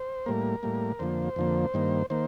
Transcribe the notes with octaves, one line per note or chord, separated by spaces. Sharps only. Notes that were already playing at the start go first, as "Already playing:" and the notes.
Already playing: C5
A2 G3 A#3 A#4
A2 G3 A#3
F2 D3 F3 A#3 C5
F2 D3 F3 A#3
G2 D#3 A#3
D#3 A#3 C5